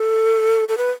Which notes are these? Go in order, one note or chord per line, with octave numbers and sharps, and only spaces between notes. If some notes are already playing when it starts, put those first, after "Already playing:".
Already playing: A4
A4
B4